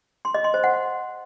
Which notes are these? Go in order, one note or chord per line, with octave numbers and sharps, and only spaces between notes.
C6
D#5
C6
C5
F#5